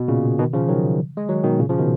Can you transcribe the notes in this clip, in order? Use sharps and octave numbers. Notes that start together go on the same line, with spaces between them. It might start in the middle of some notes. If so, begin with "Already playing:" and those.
Already playing: B2
A#2 C#3
B2 D#3
C#3 F3
D#3 F#3
G#3
D#3 F#3
B2 D#3
A#2 C#3
C#3 F3
B2 D#3